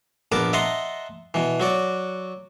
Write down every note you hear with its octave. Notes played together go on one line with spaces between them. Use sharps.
A#1 B3 A#4 B4 A5 D6
D#5 E5 F#5 A5 A#5 C6
B2 E3
F#3 F#4 D5